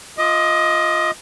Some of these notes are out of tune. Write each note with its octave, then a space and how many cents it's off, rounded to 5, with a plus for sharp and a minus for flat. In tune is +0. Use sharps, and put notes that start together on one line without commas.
F4 +0 D#5 +20 D#6 -45